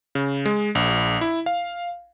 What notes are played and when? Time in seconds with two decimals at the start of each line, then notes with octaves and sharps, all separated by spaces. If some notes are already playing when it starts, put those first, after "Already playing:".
0.15 C#3
0.46 G#3
0.75 A#1
1.21 E4
1.46 F5